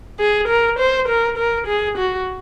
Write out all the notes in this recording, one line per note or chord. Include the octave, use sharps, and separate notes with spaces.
G#4
A#4
C5
A#4
A#4
G#4
F#4